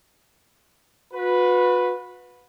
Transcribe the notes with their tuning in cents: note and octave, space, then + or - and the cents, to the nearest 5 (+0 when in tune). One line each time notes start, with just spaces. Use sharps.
F#4 -40 B4 +0